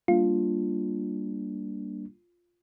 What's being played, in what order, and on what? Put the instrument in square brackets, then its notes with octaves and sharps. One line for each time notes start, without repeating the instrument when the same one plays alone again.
[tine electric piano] G3 A#3 D4 [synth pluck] F4